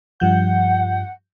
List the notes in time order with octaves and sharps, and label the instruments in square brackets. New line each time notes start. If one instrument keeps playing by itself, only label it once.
[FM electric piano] G2 F3 G6 [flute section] F#5